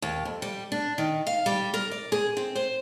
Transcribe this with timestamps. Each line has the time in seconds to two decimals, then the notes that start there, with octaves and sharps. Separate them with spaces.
0.02 D#2
0.25 F2
0.42 G3
0.72 D4
0.98 D#3
1.27 F5
1.46 G3
1.74 A#4
1.91 D5
2.12 G#4
2.37 C4
2.56 C5